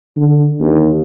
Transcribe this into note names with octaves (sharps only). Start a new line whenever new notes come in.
D3
D#2